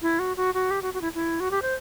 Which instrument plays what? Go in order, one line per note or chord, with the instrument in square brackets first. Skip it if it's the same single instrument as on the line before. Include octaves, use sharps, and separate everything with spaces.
[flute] E4
F#4
F#4
F#4
G4
F#4
F#4
E4
E4
F#4
G4
C5